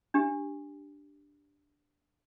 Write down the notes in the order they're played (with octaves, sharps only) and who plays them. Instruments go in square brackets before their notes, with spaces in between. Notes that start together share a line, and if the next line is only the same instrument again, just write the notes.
[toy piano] D4 G4